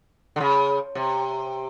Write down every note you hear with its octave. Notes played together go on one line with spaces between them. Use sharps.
D3
C#3
C3